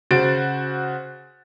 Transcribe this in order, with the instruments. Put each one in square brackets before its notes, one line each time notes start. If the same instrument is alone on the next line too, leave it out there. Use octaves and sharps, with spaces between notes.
[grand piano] C#3 F#4 C5 A6 D7